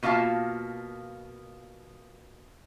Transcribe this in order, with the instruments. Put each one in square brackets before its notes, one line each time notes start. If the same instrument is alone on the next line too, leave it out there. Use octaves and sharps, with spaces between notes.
[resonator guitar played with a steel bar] B2 A#3 F4 F5 A5